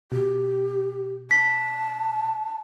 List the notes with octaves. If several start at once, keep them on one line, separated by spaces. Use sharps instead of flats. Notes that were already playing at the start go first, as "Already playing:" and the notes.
B2 G4
A5 B6